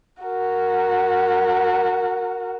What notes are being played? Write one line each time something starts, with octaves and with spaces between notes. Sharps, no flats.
F#4 A#4